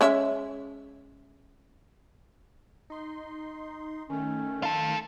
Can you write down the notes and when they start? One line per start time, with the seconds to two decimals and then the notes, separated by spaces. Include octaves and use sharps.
0.01 G#3 C#4 E5
2.90 D#4 C6
4.10 D#3 A3 C#4
4.63 F4 A4